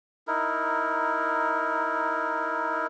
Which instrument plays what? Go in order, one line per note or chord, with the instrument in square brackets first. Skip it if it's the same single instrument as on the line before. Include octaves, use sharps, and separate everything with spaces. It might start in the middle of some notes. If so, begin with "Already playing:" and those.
[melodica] D#4 E4 A#4